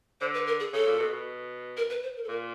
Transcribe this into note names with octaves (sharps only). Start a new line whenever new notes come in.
D3 C5
B4
A#4
G#4
C#3 A4
A#2
B2
B2
A#4
B4
C5
A#4
A4
A#2 A#4